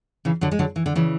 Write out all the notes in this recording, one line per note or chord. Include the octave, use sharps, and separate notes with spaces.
C#3 E3
D3 F#3
G#3
D3 F#3
E3
D3
C#3 E3